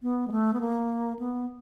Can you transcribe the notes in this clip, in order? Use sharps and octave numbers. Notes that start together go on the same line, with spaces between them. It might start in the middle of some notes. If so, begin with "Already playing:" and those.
B3
G#3
A3
B3
A#3
B3